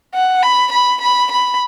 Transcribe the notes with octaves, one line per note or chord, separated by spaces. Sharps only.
F#5
B5
B5
B5
B5